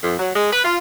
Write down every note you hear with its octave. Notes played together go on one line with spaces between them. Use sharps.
F2
F#3
G#3
B4
F4